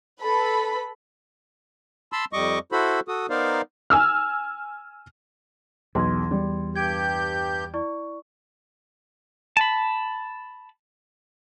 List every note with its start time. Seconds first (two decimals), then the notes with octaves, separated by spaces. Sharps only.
0.22 A4 B4 B5
2.13 A5 B5 C6 E6
2.33 F2 G3 D#5 C#6 D6
2.72 E4 F#4 A4 C5 B5
3.08 F#4 A4 D#6
3.30 B3 D#4 A#4 C5 D5 F5
3.90 G#5 E6 F6
5.95 B1 E2 C6 G#6
6.31 G3
6.76 G2 G4 G6 G#6 D7
7.74 E4 D5 C#6
9.57 A5 B5